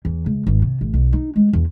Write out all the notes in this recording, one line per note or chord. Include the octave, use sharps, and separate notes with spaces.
E2
C#2
G#1
C3
A1
B1
D#4
G#3
E2